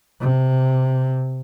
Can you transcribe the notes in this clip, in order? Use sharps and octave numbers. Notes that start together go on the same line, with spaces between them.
C3